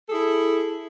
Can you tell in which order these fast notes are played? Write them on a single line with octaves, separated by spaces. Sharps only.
A4 G#4 E4